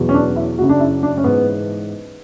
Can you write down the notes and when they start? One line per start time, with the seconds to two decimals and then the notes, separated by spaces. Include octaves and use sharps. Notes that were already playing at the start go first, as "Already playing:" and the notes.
Already playing: E2 B2 F#3
0.09 C#4
0.14 D4
0.36 E4
0.58 F#2 C#3 F#3 F#4
0.69 D4
0.80 E4
1.03 D4
1.18 C#4
1.24 G#2 E3 B3